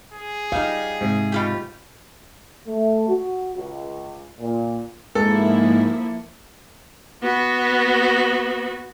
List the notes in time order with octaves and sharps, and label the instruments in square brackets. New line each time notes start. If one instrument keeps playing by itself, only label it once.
[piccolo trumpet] G#4
[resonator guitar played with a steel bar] G3 D#4 [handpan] F5
[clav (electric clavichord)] G#2 C3
[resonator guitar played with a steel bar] B2 F4 G4
[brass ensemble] A3
F#4
C#2
A#2
[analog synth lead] G#2 [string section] F3 A#3 E4 [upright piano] A4
[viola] B3 F#4